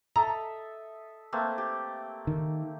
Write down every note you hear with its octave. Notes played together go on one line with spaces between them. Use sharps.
A4 D#5 E5 A#5
A3 A#3 C4
G4
D#3